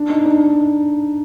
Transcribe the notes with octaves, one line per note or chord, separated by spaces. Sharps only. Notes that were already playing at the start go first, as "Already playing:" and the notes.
Already playing: D4
D#4
D4
D#4